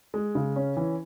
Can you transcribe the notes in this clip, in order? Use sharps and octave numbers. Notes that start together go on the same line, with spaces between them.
G#3
C#3
C#4
E3